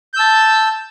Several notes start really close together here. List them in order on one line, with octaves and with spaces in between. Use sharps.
G6 E6 A5